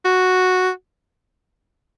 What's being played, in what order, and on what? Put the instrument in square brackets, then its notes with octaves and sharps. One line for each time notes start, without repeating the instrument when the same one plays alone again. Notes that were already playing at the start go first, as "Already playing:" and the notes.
[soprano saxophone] F#4